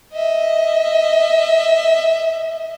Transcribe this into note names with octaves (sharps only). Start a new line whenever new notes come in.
D#5 E5